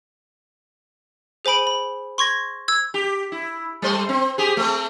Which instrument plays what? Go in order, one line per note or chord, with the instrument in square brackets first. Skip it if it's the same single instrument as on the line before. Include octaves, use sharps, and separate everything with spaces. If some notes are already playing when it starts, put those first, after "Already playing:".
[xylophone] G#4 C5 G#5 B5 D7
B5
C6 C#6 G#6 A#6
E6 G#6
[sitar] G4
E4
G3 A3 C5
C4
G4 G#4
A3 C4